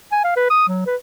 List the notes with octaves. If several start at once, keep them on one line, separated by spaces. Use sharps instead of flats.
G#5
F5
B4
D#6
F#3
B4